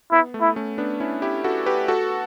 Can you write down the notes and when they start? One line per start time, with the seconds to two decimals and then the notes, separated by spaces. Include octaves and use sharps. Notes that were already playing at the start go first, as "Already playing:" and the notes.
0.12 B3 E4
0.34 A3
0.41 E4
0.56 A3 C#4
0.78 B3 D4
1.00 C#4 E4
1.22 E4 G4
1.44 F#4 A4
1.66 G4 B4
1.88 F#4 A4